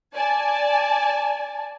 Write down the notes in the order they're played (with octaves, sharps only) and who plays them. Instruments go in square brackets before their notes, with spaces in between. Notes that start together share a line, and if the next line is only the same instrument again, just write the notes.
[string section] D5 G#5 A5